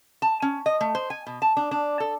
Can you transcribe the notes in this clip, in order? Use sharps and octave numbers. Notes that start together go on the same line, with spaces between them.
A5
C#4
D#5
A3
C5
G#5
B2
A5
D4
D4
A4